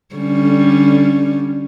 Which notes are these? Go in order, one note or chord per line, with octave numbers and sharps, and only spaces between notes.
D3 G3 C#4